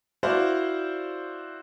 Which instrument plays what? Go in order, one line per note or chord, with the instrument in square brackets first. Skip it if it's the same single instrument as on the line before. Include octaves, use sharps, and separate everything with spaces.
[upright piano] E4 F#4 C5 D5 F5